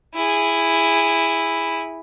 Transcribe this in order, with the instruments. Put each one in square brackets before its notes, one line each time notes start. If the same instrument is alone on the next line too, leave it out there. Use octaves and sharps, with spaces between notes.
[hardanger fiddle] E4 G#4